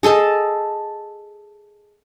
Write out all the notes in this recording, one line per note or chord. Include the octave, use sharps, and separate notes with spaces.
G#4 A4 D#5 A5